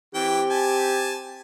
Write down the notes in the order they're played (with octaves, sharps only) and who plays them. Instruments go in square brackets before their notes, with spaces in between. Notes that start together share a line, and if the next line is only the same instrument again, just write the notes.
[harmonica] E3 G5 [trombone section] C4 G4
[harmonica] G#5 A5